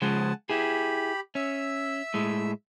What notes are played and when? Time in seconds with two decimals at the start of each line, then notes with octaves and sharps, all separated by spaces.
0.02 C#3 F3 G#3 F#5 G#5 A5
0.49 E4 G4 G#4 B5
1.35 C#4 E5 E6
2.14 A2 G#3